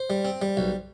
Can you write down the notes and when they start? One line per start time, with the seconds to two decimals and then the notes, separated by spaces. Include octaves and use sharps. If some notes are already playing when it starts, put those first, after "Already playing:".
Already playing: C5
0.10 G3
0.25 C4
0.42 G3
0.57 B1